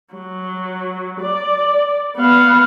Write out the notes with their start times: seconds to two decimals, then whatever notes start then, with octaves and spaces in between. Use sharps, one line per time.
0.14 F#3
1.20 D5
2.16 B3 F5